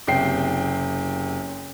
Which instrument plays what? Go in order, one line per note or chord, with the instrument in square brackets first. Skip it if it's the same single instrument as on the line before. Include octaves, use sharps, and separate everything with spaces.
[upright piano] F#1 C3 G5 C7